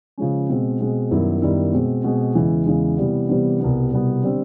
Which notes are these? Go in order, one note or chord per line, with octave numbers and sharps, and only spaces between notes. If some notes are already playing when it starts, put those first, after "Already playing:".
C#3 F3 G#3 C#4
B2 G#3 C4
B2 G#3 C4
F#2 D#3 G3 B3 E4
F#2 D#3 G3 B3 E4
B2 G#3 C4
B2 G#3 C4
E2 C#3 E3 G#3
E2 C#3 E3 G#3
C3 E3 G3 B3
C3 E3 G3 B3
C2 B2 G3 B3
C2 B2 G3 B3
D3 G3 C4